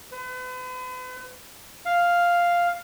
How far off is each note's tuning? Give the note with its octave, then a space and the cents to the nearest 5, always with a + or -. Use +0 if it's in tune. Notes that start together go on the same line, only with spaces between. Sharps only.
B4 +40
F5 +0